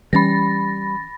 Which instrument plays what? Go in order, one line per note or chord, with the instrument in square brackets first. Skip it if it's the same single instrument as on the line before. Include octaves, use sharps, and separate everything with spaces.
[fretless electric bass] E3 C#4 [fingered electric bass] G3 [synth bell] B5 A6 A#6